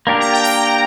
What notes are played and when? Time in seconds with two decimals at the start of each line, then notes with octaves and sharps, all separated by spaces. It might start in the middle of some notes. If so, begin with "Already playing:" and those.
0.07 A#3 D4 G4 A#4
0.20 A#5
0.32 G5
0.44 A#5